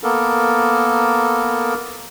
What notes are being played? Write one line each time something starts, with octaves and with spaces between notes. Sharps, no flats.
A#3 B3 A4 A#4